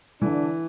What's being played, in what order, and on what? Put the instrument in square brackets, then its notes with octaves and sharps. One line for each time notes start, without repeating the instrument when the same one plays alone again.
[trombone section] D3 D4 [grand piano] E3